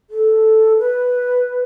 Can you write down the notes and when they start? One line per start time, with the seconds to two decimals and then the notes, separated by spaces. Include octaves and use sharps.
0.10 A4
0.79 B4